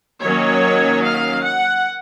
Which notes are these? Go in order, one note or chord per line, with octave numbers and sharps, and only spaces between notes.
D#3 F#3 A#3 C#4 C#5
F5
F#5